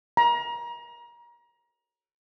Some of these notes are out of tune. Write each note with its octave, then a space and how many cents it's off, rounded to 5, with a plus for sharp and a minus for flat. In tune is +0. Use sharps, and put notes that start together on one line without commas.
A#5 +30